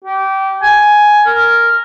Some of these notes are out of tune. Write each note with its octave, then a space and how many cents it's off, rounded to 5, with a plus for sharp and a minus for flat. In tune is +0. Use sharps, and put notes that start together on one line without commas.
G4 -20
G#5 +5
A#4 -5